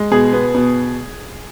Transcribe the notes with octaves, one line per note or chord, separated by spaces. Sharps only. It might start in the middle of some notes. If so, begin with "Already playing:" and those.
Already playing: G#3
B2 G#4
B3
B2